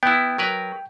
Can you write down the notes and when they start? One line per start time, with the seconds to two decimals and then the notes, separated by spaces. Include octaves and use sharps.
0.03 B3 E4 G5
0.38 F#3 A#4 B4